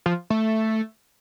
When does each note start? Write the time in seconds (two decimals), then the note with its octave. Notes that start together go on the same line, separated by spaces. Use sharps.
0.06 F3
0.30 A3